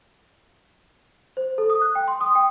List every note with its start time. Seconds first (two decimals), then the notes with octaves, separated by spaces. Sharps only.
1.37 C5
1.58 A4
1.70 D#6
1.82 F#6
1.95 G5
2.08 C6
2.21 D#6
2.35 G5